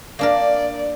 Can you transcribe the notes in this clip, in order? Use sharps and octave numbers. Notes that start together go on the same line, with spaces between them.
A#3 D4 A#4 D5